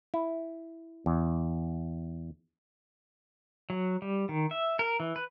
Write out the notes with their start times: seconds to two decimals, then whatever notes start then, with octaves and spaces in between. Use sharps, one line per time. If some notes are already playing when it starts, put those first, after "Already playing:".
0.14 E4
1.06 E2
3.70 F#3
4.02 G3
4.29 D#3
4.51 E5
4.79 A#4
5.00 E3
5.16 B4